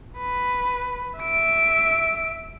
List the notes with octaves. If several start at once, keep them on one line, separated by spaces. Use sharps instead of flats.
B4
E5 D7